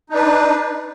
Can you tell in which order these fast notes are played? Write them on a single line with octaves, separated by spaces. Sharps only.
D#4 D4 B4